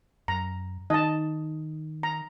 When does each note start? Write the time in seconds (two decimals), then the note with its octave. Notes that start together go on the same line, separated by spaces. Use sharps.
0.28 F#2 A#5
0.90 D#3 D#4 D#5 A5
2.03 A#5